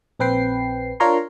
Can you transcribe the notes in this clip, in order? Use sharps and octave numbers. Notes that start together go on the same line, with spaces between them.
A#1 C4 B4 G5 C7
D4 F4 A#4 C#5 A#5 C6